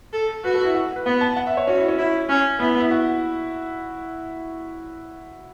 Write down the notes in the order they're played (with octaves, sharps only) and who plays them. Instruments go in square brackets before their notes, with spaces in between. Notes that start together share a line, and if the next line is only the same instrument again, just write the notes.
[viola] A4
[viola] F#4 [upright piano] B4
[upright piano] A4
E4
F#4
B4
[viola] B3 [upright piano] F#5
[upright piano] A5
F#5
E5
C#5
[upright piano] C#4 [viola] F#4
[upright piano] E4
C#4
[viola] E4
C#4
[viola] B3 [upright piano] E4
[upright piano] E4
F#4